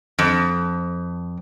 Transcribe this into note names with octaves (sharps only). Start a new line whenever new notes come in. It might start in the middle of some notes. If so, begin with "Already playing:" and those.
F2